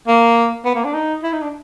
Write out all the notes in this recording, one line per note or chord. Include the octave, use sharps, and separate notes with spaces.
A#3
B3
A#3
D4
D#4
E4
D#4
D4